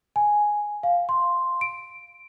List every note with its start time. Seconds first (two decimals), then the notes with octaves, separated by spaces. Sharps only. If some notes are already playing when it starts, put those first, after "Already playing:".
0.16 G#5
0.83 F5
1.09 C6
1.61 D7